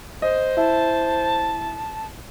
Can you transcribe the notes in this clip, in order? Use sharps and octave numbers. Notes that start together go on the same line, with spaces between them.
C5 D#5
E4 A5